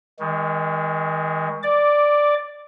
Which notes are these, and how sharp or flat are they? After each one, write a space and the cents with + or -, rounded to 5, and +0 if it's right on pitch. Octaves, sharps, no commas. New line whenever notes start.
D#3 +35 G#3 -15
D5 +0 D6 -10